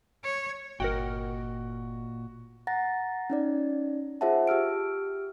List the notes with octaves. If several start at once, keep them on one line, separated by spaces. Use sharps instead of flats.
C#5
G1 A#2 F#4 A#4 D#5 F#5 G5
F#5 A#5 A6 A#6
C#4 D#4 D5
F4 G#4 C5 E5 F#5 A5
G4 E6 F6 D7